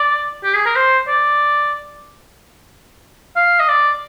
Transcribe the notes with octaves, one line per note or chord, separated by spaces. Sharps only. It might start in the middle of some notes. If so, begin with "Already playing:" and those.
Already playing: D5
G4
G#4
A#4
C5
D5
F5
D#5
D5